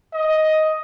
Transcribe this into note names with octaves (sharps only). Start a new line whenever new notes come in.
D#5